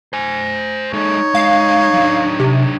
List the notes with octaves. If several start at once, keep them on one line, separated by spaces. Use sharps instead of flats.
C5 G#5
G#3 D#4 A4 C#5
G#3 F5
F#3 D4
C3